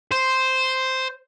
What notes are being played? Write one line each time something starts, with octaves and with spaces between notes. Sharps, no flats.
C5